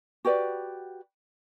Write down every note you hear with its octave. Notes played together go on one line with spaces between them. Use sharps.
F#4 G4 B4 D5